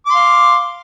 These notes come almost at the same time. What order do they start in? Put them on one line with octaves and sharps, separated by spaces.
D6 C6 F5